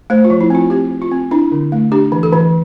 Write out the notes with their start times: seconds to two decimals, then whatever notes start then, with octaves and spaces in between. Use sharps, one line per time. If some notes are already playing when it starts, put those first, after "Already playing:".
0.10 A3 C5
0.25 F4
0.30 F3
0.41 E4
0.50 C4 F4
0.70 C4 G4
0.91 C4
1.02 F4
1.11 C4
1.31 D4 E4
1.52 D3
1.72 A3
1.92 D4 G4
2.12 E3
2.23 A4
2.33 E3